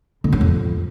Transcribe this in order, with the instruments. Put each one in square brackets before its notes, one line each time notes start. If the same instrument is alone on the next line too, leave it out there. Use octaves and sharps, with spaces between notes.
[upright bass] D3
F#3
F2